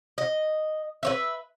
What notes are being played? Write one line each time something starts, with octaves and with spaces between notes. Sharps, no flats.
D#5
B4 C#5 E5